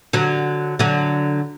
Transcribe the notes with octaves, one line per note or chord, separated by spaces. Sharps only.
D3 F#3
D3 F#3